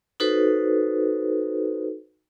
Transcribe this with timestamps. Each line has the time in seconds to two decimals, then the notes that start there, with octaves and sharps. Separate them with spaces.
0.20 D#4 F#4 A4 B4 C5